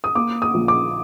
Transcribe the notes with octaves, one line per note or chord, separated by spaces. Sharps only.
D#6
A#3 D6
D#6
A#1
D6